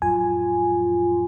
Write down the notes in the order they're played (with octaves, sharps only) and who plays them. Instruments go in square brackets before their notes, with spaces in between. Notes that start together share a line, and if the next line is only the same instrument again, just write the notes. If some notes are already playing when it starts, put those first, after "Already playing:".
[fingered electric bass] A1 F2 F#3 [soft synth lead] F4 [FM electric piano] G#5